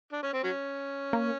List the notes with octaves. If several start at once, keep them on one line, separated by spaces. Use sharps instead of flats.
D4
C#4
C4
F#3 C#4
A#3